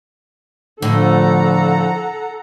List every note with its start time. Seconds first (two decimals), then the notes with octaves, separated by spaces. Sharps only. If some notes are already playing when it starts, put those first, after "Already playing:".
0.82 A2 D3 F3 A4 F#5 A#5